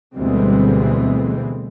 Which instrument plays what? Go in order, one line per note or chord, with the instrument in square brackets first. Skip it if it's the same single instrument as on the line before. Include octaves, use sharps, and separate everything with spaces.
[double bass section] D2 B2 E3 G3 G#3 C4